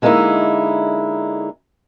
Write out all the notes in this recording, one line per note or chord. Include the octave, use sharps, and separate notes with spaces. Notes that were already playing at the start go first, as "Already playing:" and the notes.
D3 G#3 A#3 C#4 D#4 E4